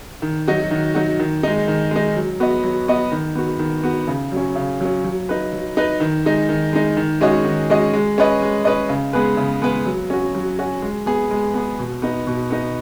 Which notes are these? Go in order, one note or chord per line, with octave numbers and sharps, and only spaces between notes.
D#3
F#3 D#4 F#4
D#3
F#3 D#4 F#4
D#3
G#3 D#4
D#3
G#3 D#4
F#3
B3 F#4 D#5
F#3
B3 F#4 D#5
D#3
B3 F#4
D#3
B3 F#4
C#3
F#3 C#4
C#3
F#3 C#4
F#3
D#4 B4
F#3
D#4 B4
D#3
G#3 D#4
D#3
G#3 D#4
D#3
G#3 C#4 F#4 D#5
D#3
G#3 C#4 F#4 D#5
G#3
C#4 B4 D#5
G#3
C#4 B4 D#5
C#3
G#3 B3 G#4 B4
C#3
G#3 B3 G#4 B4
F#3
C#4 F#4
F#3
C#4 F#4
G#3
B3 G#4
G#3
B3 G#4
B2
B3 D#4
B2
B3 D#4